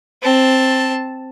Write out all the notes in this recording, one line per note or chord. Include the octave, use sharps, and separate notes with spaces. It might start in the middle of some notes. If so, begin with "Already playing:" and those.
C4 A5